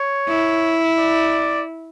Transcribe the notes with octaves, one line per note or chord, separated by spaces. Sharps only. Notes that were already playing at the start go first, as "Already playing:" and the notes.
Already playing: C#5
E4
D5